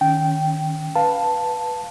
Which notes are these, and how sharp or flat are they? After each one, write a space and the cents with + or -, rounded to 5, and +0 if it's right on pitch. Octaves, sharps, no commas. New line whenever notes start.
D#3 +0 C#4 +25 G5 -10
B4 +0 F5 +10 A5 +0